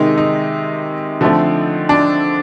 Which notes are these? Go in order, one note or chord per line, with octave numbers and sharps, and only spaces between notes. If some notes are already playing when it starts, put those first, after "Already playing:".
Already playing: C3 D#3 G#3 D#4
D#4
D3 F3 A3 C4
D4